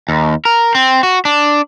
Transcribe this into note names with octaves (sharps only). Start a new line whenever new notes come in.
D#2
A#4
C4
F#4
D4